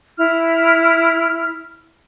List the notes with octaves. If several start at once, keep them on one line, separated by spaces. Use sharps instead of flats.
E4 F6